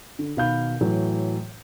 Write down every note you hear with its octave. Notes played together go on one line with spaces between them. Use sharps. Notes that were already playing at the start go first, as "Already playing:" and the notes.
D3
B2 D#3 F5 B5 G6
A2 E3 F#3